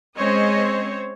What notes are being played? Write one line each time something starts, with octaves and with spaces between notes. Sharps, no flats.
G#3 C4 C#4 C5 C#5 D#5